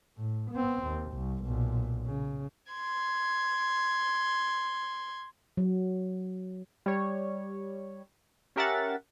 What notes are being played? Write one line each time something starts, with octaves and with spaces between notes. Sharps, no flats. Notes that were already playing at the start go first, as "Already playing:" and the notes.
A2
B3 C4
D#2
C2
B1 A#2
C#3
C6 G#6
F#3
G3 C#5
C#4 G4 A#4 E5 F#5 A6